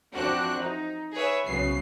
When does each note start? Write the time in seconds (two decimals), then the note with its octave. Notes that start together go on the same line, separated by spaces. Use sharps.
0.14 F2 E3 C4 D4 F#4 F#6
0.60 D#4
1.13 G#4 B4 C#5 E5
1.46 C2 C#3 F#3 B3 C7